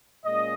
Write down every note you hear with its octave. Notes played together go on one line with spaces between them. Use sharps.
A#2 G#3 C#4 D#5